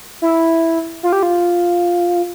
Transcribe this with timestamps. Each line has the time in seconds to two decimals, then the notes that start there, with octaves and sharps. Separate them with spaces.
0.22 E4
1.03 F4
1.12 G4
1.23 F4